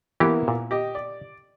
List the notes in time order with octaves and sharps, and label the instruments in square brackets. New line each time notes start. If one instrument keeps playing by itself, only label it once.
[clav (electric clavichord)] E3 G4 [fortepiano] A#3 B3 E4
[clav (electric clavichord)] A#2
[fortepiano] G4 D#5
D5